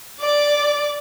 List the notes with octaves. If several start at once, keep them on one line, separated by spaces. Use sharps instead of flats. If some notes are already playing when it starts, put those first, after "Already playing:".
D5 D6